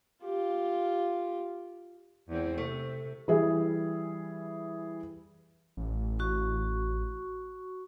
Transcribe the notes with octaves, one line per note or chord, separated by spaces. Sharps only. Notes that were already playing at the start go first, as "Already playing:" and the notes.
F4 G4
E2 C4
C3 A3
E3 G3 G#4 E5
A1
F#4 C#6